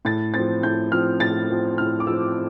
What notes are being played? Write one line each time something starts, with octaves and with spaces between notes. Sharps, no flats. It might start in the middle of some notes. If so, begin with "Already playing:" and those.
A2 A6
F3 C4 A6
A2 G6
F3 C4 F6
A2 A6
F3 C4
A2 F6
D6
F3 E6
C4